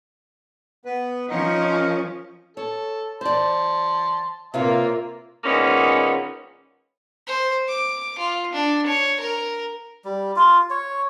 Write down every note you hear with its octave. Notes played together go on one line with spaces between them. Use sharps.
B3 B4
F3 C#4 D#4 A#4 D#5
A4 C#5
C5 D5 A5 C6
C3 A#3 F4 B4 C#5 E5
A#2 D#3 G#3 A#3 B3 C#4
C5
D6
F4
D4
C#5
A#4
G3
F4
C#5